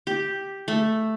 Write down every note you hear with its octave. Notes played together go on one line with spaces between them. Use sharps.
G4
A3